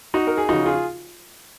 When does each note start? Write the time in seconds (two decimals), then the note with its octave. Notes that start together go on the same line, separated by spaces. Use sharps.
0.14 D#4 F#4
0.27 A#4
0.37 G#4
0.49 C#3 F3 D#4 F#4
0.66 F4 G#4